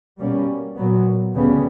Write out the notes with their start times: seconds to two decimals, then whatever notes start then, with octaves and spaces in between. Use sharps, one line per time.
0.19 B2 G3 A#3 C#4
0.76 A#2 F#3 B3
1.34 D2 C#3 G3 B3